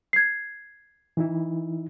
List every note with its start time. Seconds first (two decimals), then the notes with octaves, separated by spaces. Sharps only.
0.13 G#6 C7
1.17 E3 D#4 E4